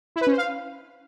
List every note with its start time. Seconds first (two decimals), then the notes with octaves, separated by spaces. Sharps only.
0.16 E4
0.21 B4
0.27 C#4
0.32 C5
0.38 F5